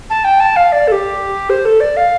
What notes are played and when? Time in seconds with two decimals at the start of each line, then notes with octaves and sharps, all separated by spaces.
0.10 A5
0.24 G5
0.40 A5
0.56 F5
0.72 D5
0.88 A4
0.92 G4
1.50 C5
1.65 A4
1.80 D5
1.97 F5